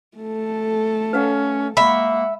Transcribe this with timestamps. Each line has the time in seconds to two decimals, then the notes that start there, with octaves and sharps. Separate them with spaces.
0.18 A3 A4
1.13 C#4 B4 F5 F#5
1.77 G#3 A#3 E5 F#5 B5 C#6